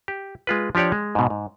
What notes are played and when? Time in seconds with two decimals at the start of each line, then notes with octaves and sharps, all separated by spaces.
0.08 G4
0.47 G#3 F4 B4
0.75 F3 D4 G4 C#5 D5
0.92 G#3
1.15 G#2 B2
1.30 G#2